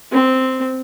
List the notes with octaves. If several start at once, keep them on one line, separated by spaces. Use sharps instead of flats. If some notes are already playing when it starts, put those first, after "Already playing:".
C4